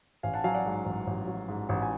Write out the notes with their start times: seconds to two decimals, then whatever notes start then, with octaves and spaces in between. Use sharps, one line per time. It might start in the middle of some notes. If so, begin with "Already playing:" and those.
0.23 A1 F5 G#5
0.34 F#5 A5
0.44 F#3 F5 G#5
0.54 D5 F#5
0.65 G#2
0.86 A1
1.07 A1
1.27 F#3
1.48 G#2
1.69 A1
1.83 G#5